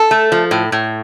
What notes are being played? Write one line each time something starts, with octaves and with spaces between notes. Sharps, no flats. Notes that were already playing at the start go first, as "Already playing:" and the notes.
Already playing: A4
A3
F3
A2
A2